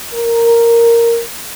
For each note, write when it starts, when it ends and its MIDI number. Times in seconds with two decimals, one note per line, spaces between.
0.15 1.22 70